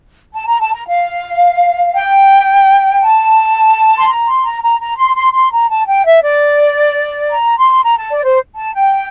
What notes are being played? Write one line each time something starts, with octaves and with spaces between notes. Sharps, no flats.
A5
A#5
A5
A#5
F5
G5
A5
C6
A#5
C6
A#5
A#5
A#5
C6
C6
C6
A#5
A5
G5
E5
D5
A#5
C6
A#5
A5
D5
C5
A5
G5